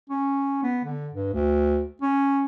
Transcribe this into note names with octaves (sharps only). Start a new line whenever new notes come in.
C#4
B3
D3
G2
D2
C#4